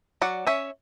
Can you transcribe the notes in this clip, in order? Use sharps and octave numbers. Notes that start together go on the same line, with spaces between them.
F#3 D5 F#5
C#4 C#5 E5